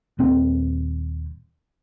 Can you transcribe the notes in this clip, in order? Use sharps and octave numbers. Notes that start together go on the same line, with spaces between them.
D#1 C4